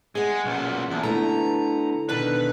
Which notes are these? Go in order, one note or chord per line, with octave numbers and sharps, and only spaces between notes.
G#3 G#4 F#5
B1 A#2 C#4
E2 A#3 F4 A5
D3 A3 B3 E4 A4 A#5
B2 D3 D#3 B4